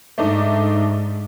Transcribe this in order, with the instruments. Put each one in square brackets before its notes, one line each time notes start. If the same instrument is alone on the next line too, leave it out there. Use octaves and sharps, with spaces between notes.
[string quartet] G#2 [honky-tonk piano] A3 D4 D#4